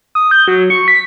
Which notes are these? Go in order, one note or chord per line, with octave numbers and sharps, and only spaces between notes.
D#6
G6
F#3
C#6
B6